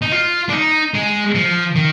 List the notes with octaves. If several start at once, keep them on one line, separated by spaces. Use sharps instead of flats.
D#4
F4
D4
D#4
G#3
F3
D#3